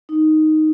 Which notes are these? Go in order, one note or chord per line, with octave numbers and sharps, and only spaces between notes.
D#4